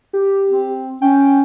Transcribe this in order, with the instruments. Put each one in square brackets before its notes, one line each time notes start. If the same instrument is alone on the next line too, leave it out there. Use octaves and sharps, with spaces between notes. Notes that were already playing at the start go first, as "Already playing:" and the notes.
[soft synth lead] G4
[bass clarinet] C4
[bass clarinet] C#4 [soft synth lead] G5